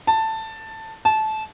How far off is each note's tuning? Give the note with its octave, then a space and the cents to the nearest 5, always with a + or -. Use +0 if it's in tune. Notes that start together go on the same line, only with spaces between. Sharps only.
A5 +10
A5 -20